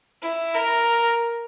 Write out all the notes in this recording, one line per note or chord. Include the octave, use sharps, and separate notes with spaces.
E4
A#4